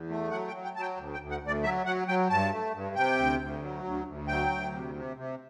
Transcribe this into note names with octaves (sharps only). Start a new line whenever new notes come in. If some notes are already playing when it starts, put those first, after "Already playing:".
Already playing: E2
A3
F#3 F#5
G5
F#3
G5
F#3 A5
G5
D2
G5
D2
F#5
D2 D5
F#3 E5
F#3 F#5
F#3 G5
G2 A5
A3
G2
C3 G5
D2
D2
F#3
D2
D2
F#3 G5
D2
C3
C3
C3